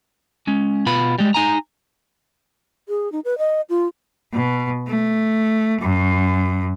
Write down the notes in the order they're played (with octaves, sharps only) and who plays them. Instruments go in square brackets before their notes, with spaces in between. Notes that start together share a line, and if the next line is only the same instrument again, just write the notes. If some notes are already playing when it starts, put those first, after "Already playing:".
[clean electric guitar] G#3 C#4
B2 F4 B4 B5
G3 G#3
D#4 G#5 A#5
[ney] G#4
D#4
B4
D#5
F4
[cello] B2
A3
F#2